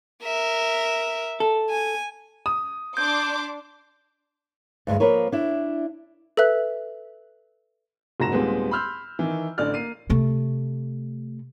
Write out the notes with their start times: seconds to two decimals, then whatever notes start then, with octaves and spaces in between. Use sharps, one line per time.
0.24 A#4 E5
1.40 A4
1.70 G#5
2.46 D#6
2.97 D4 C6 D6 G6
4.87 D2 G2 G#3
5.00 F3 A#3 A#4 B4 C#5
5.32 D4 E4
6.37 A4 B4 E5 F#6
8.20 F#1 G#2 F#4 A#5 A#6 E7
8.32 D#2 A#2 G3 G#3 B3 C4
8.71 B5 C6 E6 F6 G6
9.19 D#3 E3
9.58 A1 D3 D4 D5 F6 A6
9.74 A#3 C7 D#7
10.10 C3 A3